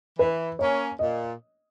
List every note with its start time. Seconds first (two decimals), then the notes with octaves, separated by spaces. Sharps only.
0.19 E3 B4
0.59 A#3 C#4 C#5
0.99 A#2 D#5